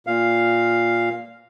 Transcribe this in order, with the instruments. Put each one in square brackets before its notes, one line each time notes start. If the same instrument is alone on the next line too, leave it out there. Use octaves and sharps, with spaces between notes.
[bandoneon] A#2 F5